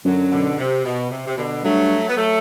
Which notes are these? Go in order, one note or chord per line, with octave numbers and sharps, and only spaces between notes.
F#2 D3 F#3
B2 D3
C3
B2
C3
C3
B2 D3
G2 F#3 A3
B3
F#3 A3